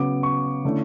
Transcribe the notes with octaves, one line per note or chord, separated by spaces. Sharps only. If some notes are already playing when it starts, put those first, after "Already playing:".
Already playing: C#3 F#3 B3 D6
C#6
D3 A3 C#4 E4